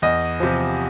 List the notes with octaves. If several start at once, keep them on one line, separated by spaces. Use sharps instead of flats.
E2 D#5
C3 F3